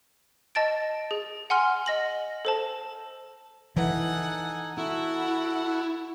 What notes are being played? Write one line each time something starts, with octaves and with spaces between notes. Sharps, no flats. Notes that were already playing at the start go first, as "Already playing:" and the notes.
D#5 A5 A6 D7
G#4
F#5 G#5 C6 F6
D#5 A#6 F#7
A4 C5 A5
E3 D#4 A4 F#5 G#5
E4 F#4 A4 F#5